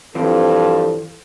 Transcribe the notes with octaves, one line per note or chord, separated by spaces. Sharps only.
G2 E3 F3 C4 A4